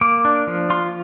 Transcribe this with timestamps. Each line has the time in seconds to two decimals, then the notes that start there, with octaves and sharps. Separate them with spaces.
0.01 A#3 D6
0.25 D4
0.47 F3
0.70 F4 C6